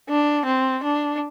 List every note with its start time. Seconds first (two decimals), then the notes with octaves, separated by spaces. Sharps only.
0.09 D4
0.46 C4
0.84 D4